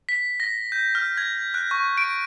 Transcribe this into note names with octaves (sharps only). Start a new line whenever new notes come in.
B6
A#6
G6
F6
G#6
F#6
C#6
D7